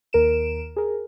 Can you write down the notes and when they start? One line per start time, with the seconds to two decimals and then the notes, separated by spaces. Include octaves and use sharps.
0.13 D#2 A#4 D7 E7
0.76 G#4 A#4